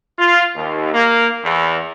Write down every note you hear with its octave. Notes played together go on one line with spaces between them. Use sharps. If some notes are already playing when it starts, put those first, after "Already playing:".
F4
D#2
A#3
E2